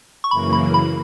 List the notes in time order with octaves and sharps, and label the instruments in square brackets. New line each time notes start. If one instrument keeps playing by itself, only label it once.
[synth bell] C#6
[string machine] F#2 C#3 E3 A#3 [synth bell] B5
[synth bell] B5
B5